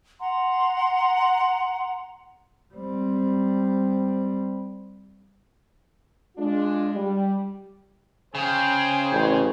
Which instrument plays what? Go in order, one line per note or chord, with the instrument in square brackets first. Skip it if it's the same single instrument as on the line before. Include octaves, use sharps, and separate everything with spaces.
[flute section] F#5 A#5 C6
[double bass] G3 C4
[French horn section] G#3 D4 F4
G3
[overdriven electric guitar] C#3 [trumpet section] G#4 C5 G5
[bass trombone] A1